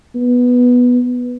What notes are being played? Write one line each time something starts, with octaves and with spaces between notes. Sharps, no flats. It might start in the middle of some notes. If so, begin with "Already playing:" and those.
B3